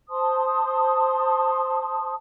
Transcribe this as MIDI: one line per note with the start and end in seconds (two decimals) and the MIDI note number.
0.09 2.14 72
0.09 2.14 81
0.09 2.14 84
0.09 2.14 87